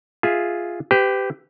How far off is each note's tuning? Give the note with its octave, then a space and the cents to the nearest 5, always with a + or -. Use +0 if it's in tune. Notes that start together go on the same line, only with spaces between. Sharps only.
F4 +0 G#4 +0 E5 +0
G4 +0 B4 +35